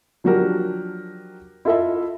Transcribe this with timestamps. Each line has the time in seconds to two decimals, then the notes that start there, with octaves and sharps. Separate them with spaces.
0.24 F3 F#3 D4 F#4 G4 A#4
1.65 E4 F4 A4 D#5 E5